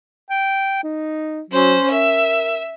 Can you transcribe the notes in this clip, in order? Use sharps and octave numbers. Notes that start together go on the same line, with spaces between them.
G5
D#4
F#3 C#4 C5
A#4 E5